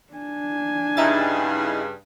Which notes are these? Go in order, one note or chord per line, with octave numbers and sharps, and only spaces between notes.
D4 G#5
G2 C#3 D#4 E4 G#4 A6